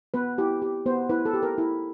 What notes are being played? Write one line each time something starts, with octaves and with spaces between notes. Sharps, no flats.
B3 B4
E4 G4
G4
B3 C5
E4 B4
A4
G4
A#4
E4